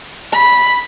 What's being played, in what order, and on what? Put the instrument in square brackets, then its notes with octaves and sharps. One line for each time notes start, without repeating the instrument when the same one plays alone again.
[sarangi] B5